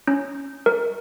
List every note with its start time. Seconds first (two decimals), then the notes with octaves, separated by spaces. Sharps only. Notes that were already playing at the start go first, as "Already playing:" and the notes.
0.08 C#4
0.66 A#4